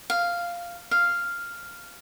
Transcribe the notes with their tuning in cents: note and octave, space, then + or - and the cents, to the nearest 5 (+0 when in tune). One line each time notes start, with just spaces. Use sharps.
F5 -5
F5 -5